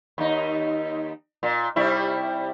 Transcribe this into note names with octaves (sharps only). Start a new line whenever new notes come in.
D#2 D#4
A#2
C3 G3 E4